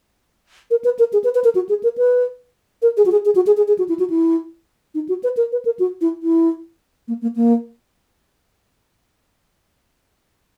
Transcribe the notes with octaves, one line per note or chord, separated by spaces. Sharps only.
A#4
B4
A#4
G#4
B4
B4
A#4
F#4
G#4
A#4
B4
A#4
G#4
F#4
G#4
G#4
F#4
G#4
G#4
G#4
F#4
E4
F#4
E4
D#4
F#4
B4
A#4
B4
A#4
F#4
E4
E4
A#3
A#3
A#3